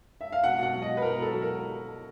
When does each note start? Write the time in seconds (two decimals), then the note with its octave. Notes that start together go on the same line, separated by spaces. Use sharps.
0.21 E5
0.32 F5
0.43 B2 F#5
0.58 B2 F#5
0.73 F#3
0.82 D#5
0.87 B2
0.97 B4
1.02 B2 A#4
1.16 B2
1.22 A4
1.31 F#3
1.42 A#4